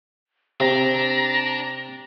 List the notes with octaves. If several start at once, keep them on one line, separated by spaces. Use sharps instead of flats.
C3 D4 A#5